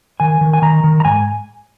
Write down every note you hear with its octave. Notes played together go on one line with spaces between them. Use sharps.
D#3 G#5
D#3
G#5
D#3 A#5
D#3
A#5
G#2 G#5